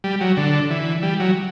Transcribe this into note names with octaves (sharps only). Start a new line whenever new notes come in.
G3
F#3
D3
E3
G3
F#3